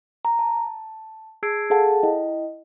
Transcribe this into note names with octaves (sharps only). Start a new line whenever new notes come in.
A#5
A5
G#4 A5 E6 G#6 C7 D7
G#4 A4 F5 F#5 A5
E4 D#5 G5